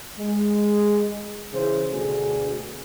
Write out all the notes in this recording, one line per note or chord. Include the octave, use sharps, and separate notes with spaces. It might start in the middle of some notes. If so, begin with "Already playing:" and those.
G#3
C#3 E3 G#4 C5
D2 B2 D3 G#4